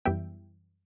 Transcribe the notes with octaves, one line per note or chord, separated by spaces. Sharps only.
F#2 E3 G3 B3 E5 G5